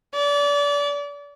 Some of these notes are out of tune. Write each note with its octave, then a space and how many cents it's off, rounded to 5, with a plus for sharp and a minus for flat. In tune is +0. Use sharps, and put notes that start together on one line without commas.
D5 -30